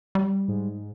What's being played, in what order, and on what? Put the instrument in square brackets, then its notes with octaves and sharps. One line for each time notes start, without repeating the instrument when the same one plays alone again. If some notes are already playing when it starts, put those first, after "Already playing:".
[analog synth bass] G3
[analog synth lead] G#2